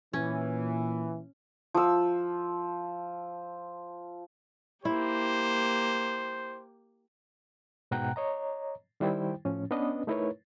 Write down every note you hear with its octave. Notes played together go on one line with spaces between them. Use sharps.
A#2 E3 C#4
F3 E6
A#3 E4 G4 C5
G#2 B2 F#5 G5 A#5 F#6
C#5 D#5 A#5
D#3 G3 E4 C5 G5
A2 F3 C#4
B3 C#4 D4 B4 D#5
A3 D#4 E4 A#4 B4 C#5